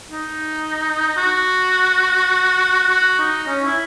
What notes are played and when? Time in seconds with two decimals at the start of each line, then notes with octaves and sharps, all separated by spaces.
0.10 D#4
1.17 F#4
2.89 F#4
3.19 D#4
3.47 C#4
3.65 E4